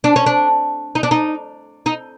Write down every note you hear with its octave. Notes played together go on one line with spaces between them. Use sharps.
D4
C#4
D4
D#4
D4
D#4
D#4